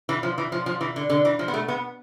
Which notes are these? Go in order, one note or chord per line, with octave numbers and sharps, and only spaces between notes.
E3
F3
E3
F3
F3
E3
D3
D3
E3
F3
B3
A3
B3